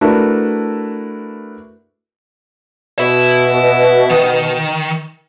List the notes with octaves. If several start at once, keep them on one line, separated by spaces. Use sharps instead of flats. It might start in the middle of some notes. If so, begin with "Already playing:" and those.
A3 D4 E4 F#4 A#4 B4
B2 E5 B5
D#3